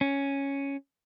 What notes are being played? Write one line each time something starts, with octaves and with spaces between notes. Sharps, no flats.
C#4